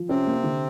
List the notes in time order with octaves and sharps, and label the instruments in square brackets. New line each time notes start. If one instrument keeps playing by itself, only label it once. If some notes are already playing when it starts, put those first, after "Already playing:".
Already playing: [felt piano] F3
[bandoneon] C3 C4 [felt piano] C#4
[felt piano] A#3
D3